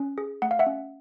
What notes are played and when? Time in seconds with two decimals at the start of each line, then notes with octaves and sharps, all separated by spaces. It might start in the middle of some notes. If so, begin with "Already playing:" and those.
Already playing: C#4
0.18 G#4
0.42 A3 F#5
0.51 F5
0.59 E5 F#5
0.66 C#4